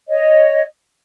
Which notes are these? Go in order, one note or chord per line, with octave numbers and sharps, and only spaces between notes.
C#5 D#5